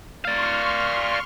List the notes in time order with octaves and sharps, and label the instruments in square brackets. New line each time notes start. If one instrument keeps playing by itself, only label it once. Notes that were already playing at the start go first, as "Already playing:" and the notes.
[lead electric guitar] D5 F5 [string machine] C6 C#6 F6